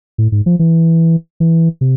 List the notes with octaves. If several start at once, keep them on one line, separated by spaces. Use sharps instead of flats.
A2
G#2
F3
E3
E3
C3